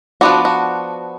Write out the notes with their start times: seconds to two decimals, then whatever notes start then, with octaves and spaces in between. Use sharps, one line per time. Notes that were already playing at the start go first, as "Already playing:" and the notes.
0.21 F3 B3 D4 F#4
0.45 F#4